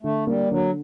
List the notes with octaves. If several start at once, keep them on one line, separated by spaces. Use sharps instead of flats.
D3 A3
G3 A#3
D3 F#3